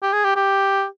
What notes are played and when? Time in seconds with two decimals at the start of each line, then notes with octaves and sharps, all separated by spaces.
0.02 G4
0.13 G#4
0.24 G4
0.36 G4